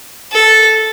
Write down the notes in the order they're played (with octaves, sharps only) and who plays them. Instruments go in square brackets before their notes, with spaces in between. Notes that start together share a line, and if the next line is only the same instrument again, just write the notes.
[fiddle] A4